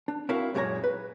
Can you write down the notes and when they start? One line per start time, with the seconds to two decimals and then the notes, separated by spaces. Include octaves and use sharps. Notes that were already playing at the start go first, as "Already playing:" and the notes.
0.08 D4
0.29 C4 E4 F#4 A#4 E5 F5
0.54 F#2 A#2 G#3 A#4 C#5 A#5
0.84 B4